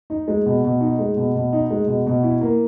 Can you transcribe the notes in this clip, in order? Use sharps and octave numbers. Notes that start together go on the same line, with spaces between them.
D#4
G#3
B2
B2
D#4
G#3
B2
B2
D#4
G#3
B2
B2
E4
A#3